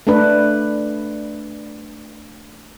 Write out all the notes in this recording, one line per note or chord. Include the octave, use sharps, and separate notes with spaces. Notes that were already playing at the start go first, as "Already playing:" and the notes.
A3 D4 B4